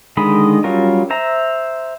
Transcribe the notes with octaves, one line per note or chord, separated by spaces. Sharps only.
D3 D#3 G#3 D#5 B5
F#3 G3 C#4 F4 A#4
C5 E5 A#5